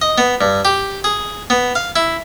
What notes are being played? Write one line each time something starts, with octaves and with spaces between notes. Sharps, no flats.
D#5
B3
G2
G4
G#4
B3
F5
E4